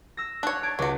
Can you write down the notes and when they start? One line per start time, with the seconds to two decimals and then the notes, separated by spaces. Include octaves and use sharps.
0.17 E6 A#6
0.43 D4 C#5 F#6
0.63 A5 G#6 A6 D7
0.79 C#2 F#3 F#4 D6